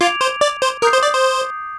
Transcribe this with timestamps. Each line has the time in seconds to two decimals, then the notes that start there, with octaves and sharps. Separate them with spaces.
0.01 F4 D6 G#6 D7 F7
0.21 C5
0.41 D5
0.62 C5
0.82 A#4 D#6 G6 C7
0.92 C5
1.03 D5
1.13 C5